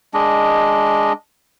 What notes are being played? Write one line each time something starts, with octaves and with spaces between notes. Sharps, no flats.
G#3 D4 D#5